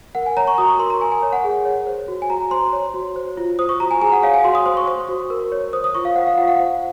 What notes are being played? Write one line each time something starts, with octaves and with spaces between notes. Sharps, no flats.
A#4 F#5
G#5
C#5 A#5
C#6
F#4 D#6
C#6
A#4 C6
A#5
A#4 G#5
G#5
C#5
F#5
G#4
C#5
C5
F#4
G#5
F#4 A#5
C5 C6
C#5
F#4
C5
F4
C5 D#6
C#6
F#4 A#5
G#5
G#4 G#5
F#5
C#5 F5
G#5
F#4 C6
D#6
C5 C6
C#6
C5 C#6
F#4
A#4
C#5
C5 D#6
D#6
F4 C#6
F5
C5 F#5
F5
F4 F#5
F#5
C5